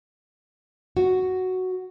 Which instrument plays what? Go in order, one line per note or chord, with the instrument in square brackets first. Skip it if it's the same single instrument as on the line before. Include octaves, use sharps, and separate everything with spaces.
[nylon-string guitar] F#4